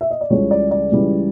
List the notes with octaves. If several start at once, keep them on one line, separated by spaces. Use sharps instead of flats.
E5
D#5
D5
C#2 C#3 E3 G3 C#5
D5
D5
C#2 C#3 E3 G3